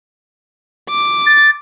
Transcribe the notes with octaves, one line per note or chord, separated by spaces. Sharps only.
D6
A6